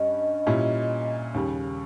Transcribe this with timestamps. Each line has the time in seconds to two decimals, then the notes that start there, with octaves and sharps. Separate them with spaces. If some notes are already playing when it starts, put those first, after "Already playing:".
Already playing: G2 G3 C#4 D#5
0.47 A#2 G3 C#4 E4
1.34 D#2 C#3 G3